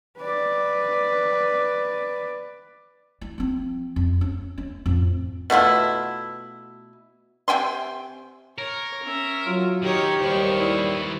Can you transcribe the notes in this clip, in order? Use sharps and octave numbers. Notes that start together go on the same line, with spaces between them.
B4 D5
E4
F3 C4
F2
C#4
C#4
F2 A2
B2 A3 E4 F4
C3 G5 G#5 C6
A#4 C#5
C#4 E5
F#3 F4
D#3 D#4 G4 A#4 C#5
D#2 D#3 G3 B3 C5 C#6
E4